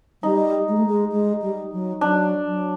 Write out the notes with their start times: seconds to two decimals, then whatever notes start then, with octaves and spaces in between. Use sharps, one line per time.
0.23 G3 D#4
0.69 G#3
0.77 A3
0.86 G#3
1.12 G#3
1.42 G3
1.72 F#3
2.01 F#3 D4
2.46 F#3